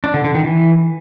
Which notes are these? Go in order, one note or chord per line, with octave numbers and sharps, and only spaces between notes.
D4
D3
D3
D#3
E3